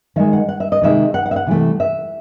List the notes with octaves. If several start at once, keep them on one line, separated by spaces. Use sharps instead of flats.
D#3 G#3 E5
F#5
F#5
E5
D#5
C3 D#3 G#3 E5
F#5
F#5
E5
F#5
C3 E3 A3
E5